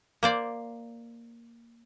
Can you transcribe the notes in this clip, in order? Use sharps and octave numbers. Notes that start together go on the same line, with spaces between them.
A#3 C5 D5